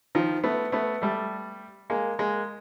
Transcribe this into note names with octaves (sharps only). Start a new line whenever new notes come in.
D#3 F3
A3 B3
A3 B3
G3 A3
G#3 A#3
G#3 A#3